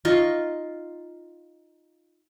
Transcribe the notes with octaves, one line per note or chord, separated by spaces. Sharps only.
D#4 F4 C#6